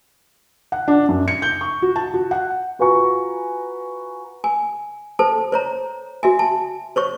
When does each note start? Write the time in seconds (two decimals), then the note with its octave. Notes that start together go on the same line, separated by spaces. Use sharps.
0.72 F#5
0.88 D4
1.09 F#2
1.28 C#7
1.42 G6
1.61 C#6
1.82 F#4
1.96 A5
2.14 F#4
2.31 F#5
2.79 F4 F#4 B4 G#5 A#5 C#6
4.44 G#5
5.19 A4 C5 A5
5.52 C5 C#5 A#5
6.23 F#4 E5 G#5
6.39 A5
6.96 C5 C#5 C#6